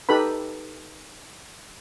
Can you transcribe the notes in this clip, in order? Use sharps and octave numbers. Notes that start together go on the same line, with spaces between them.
D#4 G4 A4 B4 B5